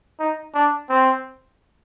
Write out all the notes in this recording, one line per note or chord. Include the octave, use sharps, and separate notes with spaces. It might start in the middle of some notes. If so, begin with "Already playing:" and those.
D#4
D4
C4